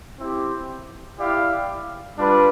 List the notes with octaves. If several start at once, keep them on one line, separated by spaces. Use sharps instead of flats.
C4 E4 G4
E4 G4 D5 F5
G3 D4 F4 B4